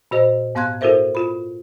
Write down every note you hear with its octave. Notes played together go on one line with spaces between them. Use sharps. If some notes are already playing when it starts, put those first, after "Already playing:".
A#2 F#4 C5 D#5
G#2 B3 F5 C6 F#6 G#6
E4 F#4 A4 A#4 C5 E5
F4 B5